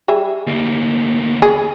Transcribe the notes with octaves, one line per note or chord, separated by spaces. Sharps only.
G3 G#4 E5
D2 A#3
G#4